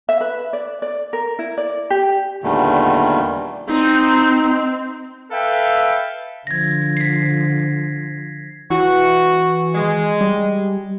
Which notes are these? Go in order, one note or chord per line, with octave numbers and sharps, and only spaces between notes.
E5
B4
D5
D5
A#4
E4
D5
G4
E2 A#2 D3 D#3 G3 A3
C4 D#4
A4 B4 E5 F5 G5
D3 F3 G#6 A#6
B6 C7
E3 F#4
G#3
G3